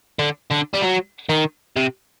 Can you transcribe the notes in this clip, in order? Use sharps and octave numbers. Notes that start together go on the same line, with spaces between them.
D3
D3
G3
F#3
D#3
C3